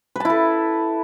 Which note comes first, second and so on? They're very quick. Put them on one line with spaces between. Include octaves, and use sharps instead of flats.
B4 A5 E4 A4